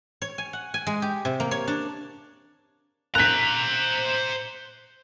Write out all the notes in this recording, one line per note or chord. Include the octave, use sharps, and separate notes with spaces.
C#5
G#5
F#5
G#5
G#3
G4
C3
A#3
C#5
D4
C5 A#5 F#6 B6